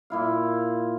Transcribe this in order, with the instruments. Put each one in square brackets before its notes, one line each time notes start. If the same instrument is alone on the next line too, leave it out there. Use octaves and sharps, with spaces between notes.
[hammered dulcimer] A#2 E4 F5